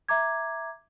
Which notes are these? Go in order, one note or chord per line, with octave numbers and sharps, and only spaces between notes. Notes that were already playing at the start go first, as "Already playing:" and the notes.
E5 A#5 D6 G#6